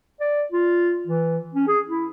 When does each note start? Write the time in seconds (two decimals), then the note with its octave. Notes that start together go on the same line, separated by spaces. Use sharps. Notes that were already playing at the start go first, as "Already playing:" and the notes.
0.20 D5
0.52 F4
1.07 E3
1.54 C#4
1.68 G#4
1.88 E4